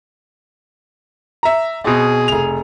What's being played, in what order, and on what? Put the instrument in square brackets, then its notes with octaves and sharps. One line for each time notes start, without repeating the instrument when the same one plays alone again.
[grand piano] E5 A#5
[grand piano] B2 C4 [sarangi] G#4
[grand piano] F1 F7